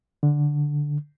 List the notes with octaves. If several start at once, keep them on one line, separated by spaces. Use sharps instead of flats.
D3